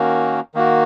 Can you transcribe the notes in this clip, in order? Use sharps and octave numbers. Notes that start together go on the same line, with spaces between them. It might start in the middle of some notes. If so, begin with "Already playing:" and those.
Already playing: D#3 A#3 C#4 F#4
D#3 A#3 F#4